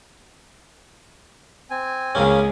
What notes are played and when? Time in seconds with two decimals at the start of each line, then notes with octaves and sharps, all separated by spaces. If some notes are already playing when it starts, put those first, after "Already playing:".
1.70 C4 G#5
2.15 C#2 C#3 A#3 C#4 G#4